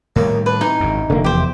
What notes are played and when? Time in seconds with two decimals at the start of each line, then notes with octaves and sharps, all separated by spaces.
0.16 A2 D#3 G3 A#3 D#4 C#5
0.46 D4 B4
0.61 C3 E3 D#4
0.80 G#1 F#2
1.10 F1 D3 A#3
1.24 E2 G4 C5